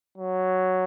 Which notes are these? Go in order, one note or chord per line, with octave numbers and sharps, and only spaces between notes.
F#3